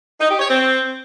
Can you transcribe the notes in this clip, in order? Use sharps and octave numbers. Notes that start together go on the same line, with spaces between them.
D#4
G4
C#5
C4